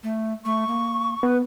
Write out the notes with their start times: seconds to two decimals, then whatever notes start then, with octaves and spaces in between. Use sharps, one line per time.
0.03 A3
0.45 A3 C#6
0.68 A#3
1.23 B3 B4